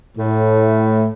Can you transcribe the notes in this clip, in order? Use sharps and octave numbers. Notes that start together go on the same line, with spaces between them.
A2